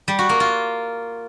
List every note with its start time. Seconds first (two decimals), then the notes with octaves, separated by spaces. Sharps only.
0.08 G3
0.19 F#4
0.29 A#3
0.40 F4